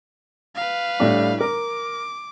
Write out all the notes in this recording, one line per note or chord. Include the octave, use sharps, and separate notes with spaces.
B4 F5
A2 G3 D4
A#4 D6